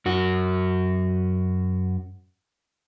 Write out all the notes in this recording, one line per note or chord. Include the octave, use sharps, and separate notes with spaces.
F#2 F#4